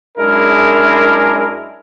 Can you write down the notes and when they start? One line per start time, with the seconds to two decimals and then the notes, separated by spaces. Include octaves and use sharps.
0.18 F#2 G#3 D4 E4 G#4 A#4